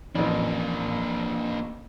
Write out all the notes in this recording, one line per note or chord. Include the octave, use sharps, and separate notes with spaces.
A1 F2 A#3 D4